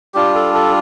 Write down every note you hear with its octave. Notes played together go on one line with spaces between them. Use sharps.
G3 D4 F4 G4
A4
A4